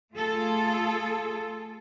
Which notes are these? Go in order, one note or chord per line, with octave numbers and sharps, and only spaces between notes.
A3 F4 G#4 A4